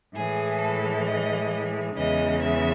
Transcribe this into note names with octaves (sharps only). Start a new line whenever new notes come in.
A2 E3 G#3 G#4
A4
D#5
E2 C#3 E3 G#3 D#5
E5